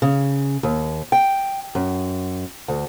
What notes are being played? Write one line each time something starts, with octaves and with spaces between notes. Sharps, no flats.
C#3
D#2
G5
F#2
D2